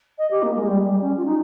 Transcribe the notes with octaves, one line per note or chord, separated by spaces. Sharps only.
D#5
G4
A#3
G#3
G3
G3
C#4
F4
D#4